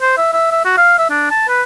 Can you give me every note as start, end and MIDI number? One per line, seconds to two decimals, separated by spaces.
0.01 0.14 72
0.17 0.31 76
0.33 0.48 76
0.52 0.64 76
0.65 0.76 66
0.77 0.96 77
0.99 1.07 76
1.10 1.26 62
1.31 1.47 81
1.48 1.63 71